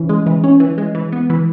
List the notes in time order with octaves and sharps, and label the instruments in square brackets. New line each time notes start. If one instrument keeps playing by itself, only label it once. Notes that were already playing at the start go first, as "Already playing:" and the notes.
Already playing: [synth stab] E3 C#4
G#3
E3
C#4
E3
G#3
E3
B3
E3